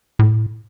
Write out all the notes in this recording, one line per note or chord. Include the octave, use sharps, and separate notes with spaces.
A2